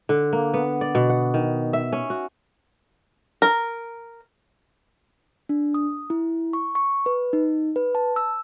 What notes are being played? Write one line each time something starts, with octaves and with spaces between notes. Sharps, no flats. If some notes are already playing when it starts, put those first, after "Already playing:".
D3
A#3
B3
D5
B2
F#5
D#3
E5
C#4
F#4
A#4
D4
D#6
E4
C#6
C#6
B4
D#4
B4
A5
E6